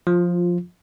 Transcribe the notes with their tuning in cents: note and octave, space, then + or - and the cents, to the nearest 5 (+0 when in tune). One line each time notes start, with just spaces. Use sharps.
F3 +15 F4 +0